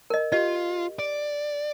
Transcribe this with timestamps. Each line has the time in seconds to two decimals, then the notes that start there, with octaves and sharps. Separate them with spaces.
0.10 A#4 D#5
0.32 F4 G4 D#5
0.99 D5